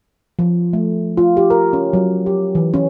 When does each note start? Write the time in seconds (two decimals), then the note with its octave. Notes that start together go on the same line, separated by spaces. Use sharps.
0.39 F3
0.73 A3
1.17 F4
1.37 G4
1.50 A#4
1.73 C#4
1.93 F#3
2.26 G4
2.55 E3
2.74 C#4